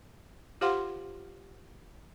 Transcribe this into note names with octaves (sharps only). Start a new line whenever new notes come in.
F4 G4 C5 F5 F#5 C6